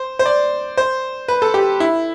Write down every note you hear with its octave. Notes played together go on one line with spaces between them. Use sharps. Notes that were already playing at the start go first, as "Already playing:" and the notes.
Already playing: C5
C5
D5
C5
B4
A4
G4
E4